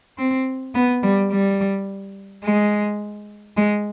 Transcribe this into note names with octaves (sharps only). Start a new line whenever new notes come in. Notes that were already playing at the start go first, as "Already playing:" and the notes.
C4
B3
G3
G3
G#3
G#3